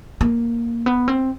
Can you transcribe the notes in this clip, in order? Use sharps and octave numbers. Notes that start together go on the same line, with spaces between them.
A#3
B3
C4